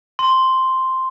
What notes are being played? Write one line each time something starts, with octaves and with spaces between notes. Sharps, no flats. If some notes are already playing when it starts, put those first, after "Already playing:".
C6